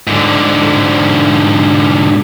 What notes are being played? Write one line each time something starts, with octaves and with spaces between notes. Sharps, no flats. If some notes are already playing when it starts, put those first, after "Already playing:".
G#2 D3